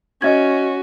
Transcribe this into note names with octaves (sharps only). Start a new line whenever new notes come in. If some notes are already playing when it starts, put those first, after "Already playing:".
C#4 F#4 D#5 E5 G#6